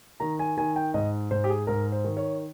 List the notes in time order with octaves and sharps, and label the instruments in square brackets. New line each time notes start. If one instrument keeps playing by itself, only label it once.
[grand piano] D#3 A#5
G#5
D#3 G#5
G5
G#2 D#5
G#2 C5
G4
G#4
G#2 A#4
C5
D#3
C#5